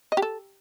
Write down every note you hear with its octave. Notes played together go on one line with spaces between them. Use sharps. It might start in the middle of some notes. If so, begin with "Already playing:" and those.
D#5
G4
A4